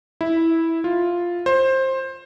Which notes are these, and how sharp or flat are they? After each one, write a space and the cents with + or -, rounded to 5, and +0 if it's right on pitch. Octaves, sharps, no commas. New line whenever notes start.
E4 -10
F4 +0
C5 +20